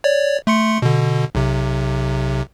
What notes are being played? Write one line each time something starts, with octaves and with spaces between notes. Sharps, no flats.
C#5 D5
A3 C6 C#7
B2 D3
B1 C3